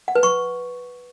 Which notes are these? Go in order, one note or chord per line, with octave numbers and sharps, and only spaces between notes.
F#5
B4
C#6